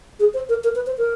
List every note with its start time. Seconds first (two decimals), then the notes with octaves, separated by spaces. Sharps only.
0.20 G#4
0.34 C5
0.49 A#4
0.64 A#4
0.75 B4
0.87 C5
0.98 A#4